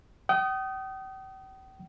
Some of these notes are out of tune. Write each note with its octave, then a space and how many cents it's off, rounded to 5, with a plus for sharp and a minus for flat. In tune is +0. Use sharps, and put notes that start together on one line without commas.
G5 -40 D#6 +0